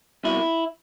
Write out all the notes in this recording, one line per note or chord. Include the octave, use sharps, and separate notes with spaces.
C2 B2 E4